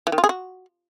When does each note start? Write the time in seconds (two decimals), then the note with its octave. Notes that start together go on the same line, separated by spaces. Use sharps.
0.07 E3
0.12 D#3
0.18 F4
0.24 G#4
0.29 F#4